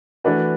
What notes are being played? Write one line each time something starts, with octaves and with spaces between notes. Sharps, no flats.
E3 A3 D4 F#4 B4